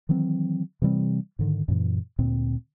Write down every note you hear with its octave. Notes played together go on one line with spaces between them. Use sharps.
D#3 E3 F#3 C4
C3 E3 G3 C4
G#2 D3 D#3
F#2 A#2 E3
D2 A#2 C4